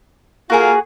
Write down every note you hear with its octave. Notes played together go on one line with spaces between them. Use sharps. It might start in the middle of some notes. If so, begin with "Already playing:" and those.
A#3 F4 F#4 G#4